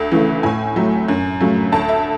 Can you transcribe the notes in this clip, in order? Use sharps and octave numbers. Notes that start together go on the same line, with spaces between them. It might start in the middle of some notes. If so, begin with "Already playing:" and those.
Already playing: D2
C#3 E3 A3
A2 G#5
F#3 A3
F#2
C#3 F#3 A3
D2 A5
E5